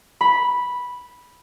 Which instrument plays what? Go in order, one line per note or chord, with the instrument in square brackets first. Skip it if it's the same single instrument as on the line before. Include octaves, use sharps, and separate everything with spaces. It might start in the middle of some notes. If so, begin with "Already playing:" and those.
[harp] B5